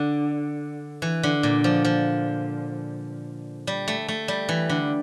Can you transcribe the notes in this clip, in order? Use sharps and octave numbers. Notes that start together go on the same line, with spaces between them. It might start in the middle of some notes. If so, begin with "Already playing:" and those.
Already playing: D3
E3
D3
A#2
F3
F3
G3
A3
A3
G3
E3
D3